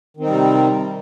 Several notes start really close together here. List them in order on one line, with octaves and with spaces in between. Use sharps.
D#3 C4 D#4 G3 C3